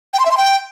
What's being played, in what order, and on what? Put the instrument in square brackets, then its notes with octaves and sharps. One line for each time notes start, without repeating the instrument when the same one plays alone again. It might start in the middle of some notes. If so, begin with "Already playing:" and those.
[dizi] G5
C6
E5
C6
G5